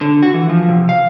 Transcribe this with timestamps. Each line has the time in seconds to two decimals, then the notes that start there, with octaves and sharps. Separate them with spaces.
0.01 D3
0.23 F#4
0.34 E3
0.49 F3
0.69 C3
0.89 F5